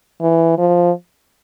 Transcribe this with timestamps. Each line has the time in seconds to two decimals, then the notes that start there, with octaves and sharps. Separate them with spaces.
0.21 E3
0.58 F3